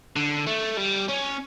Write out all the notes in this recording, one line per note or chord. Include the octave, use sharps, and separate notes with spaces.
D3
A3
G3
C#4